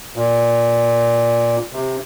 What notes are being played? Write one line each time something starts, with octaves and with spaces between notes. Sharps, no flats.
A#2
C3